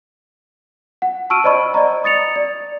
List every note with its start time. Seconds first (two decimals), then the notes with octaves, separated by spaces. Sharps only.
1.02 F#5
1.30 A5 C#6 E6 F6 D7 D#7
1.44 C5 D5 D#5 B5 C#6
1.74 D5 D#5 A#5
2.04 D#6 A6 C#7 F7
2.36 D5